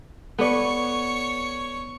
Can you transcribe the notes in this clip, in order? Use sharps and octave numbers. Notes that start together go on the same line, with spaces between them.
B3 A4 C#5 D5 C#6